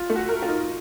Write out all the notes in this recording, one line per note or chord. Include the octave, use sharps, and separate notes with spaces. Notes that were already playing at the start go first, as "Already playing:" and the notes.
Already playing: F4
A3
F#4
A#4
F4
D#4